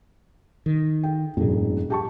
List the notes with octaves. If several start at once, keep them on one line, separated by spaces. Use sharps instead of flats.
D#3
G5
E1 A1 F#2 F#3
G4 A5 C#6